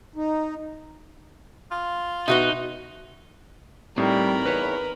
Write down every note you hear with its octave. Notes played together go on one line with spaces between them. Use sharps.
D#4
F4
B2 D#4 F#4 B4 E5
A2 G3 C4 D#4 A#4 B5
E2 D#4 B4 C#5